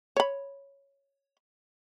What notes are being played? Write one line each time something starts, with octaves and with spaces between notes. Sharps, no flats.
C#5 B5